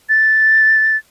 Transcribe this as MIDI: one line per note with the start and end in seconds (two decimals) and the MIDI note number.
0.09 0.96 93